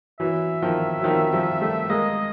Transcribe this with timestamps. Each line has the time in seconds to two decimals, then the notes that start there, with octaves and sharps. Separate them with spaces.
0.20 E3 F#3 E5
0.62 D#3 F3
0.99 F#3
1.04 D#3 F3
1.32 F3 G3
1.61 G3 A3
1.89 G#3 A#3 D#5